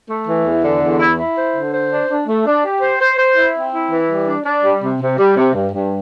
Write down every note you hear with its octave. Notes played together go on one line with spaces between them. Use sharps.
A3
E3
E2
D3
E2
E4
E4
C5
D3
C5
D4
D4
A3
D4
G4
C5
C5
C5
E4
C4
E4
E3
G3
D4
D4
G3
C3
C3
G3
C3
G2
G2